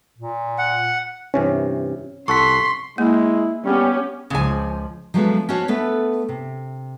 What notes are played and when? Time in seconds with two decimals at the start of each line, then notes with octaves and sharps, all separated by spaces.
0.18 A#2
0.58 F#5
1.34 G2 C3 E3 C#4
2.28 C2 A4 F#5 C6 C#6 B6
2.98 G#3 A#3 E4
3.64 G3 B3 C#4 G4
4.30 C#2 C#3 F3 G#5
5.14 F3 F#3 G#3 A3 B3 D4
5.49 C#4 D4 F#4 C5 C#5
5.68 A3 B3 A4 B4
6.29 C3